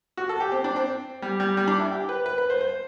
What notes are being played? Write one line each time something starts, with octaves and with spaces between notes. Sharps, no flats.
F#4
A4
G4
C4
D4
C4
G3
G3
G3
D4
E4
G4
B4
B4
B4
C5
C5